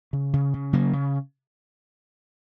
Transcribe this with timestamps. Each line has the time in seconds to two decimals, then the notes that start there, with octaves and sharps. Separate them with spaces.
0.13 C#3
0.33 C#3
0.54 C#3
0.73 C#3 F#3 A#3
0.93 C#3